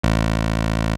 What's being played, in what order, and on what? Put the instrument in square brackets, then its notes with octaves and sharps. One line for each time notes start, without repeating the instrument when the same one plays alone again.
[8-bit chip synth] A1